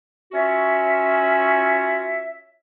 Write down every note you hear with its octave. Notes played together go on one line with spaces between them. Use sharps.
C#4 F4 F#4 C#5 E5